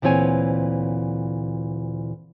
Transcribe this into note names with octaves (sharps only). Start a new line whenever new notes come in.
D2 A#2 E3 C4 C#5 G#5